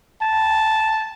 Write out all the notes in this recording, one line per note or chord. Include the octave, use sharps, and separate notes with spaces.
A5